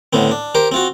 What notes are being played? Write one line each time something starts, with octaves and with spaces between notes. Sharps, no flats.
A2 D3 B3 C4
D4
G4 A#4 C5
C4 F4 F#4